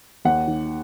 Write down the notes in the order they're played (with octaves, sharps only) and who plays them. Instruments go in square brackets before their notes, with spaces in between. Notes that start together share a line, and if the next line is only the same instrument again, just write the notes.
[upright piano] D#2 F#5
D#3